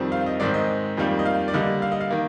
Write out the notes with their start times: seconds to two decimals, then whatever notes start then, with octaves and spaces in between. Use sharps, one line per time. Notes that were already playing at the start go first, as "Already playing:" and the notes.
Already playing: F2 D#3 G3 C4
0.12 F5
0.26 D#5
0.40 G#2 D#3 G#3 C4 D5
0.54 D#5
0.97 F2 D#3 G3 A#3
1.19 D#5
1.26 F5
1.48 D5
1.53 D3 G3 A#3 D#5
1.82 F5
1.92 D#5
2.00 F5
2.11 D#3 A#3